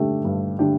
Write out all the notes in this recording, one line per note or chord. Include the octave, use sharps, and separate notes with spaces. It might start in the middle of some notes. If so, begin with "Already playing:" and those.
Already playing: G2 D3 A3 D4 G4
G2
D3 A3 D4 G4